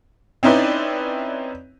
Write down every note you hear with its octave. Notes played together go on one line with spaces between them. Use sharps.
C4 C#4 D#4 E4 B4 D5